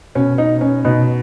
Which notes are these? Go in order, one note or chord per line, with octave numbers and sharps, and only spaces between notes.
B2 C#4
D#4
C#4
B2 D#4